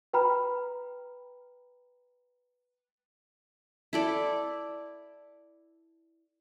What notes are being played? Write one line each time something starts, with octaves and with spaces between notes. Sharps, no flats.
B4 G5 A#5 B5 F6
E4 A4 D5